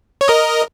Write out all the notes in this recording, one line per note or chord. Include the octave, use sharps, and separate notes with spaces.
C#5
A#4 D#5